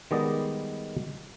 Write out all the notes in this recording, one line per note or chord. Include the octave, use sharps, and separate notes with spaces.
D#3 G3 G#3 B3 D5 D#5